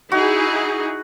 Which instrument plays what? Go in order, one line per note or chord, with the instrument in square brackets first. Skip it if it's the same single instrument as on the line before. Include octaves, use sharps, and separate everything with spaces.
[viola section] D#4 E4 G#4 [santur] F#4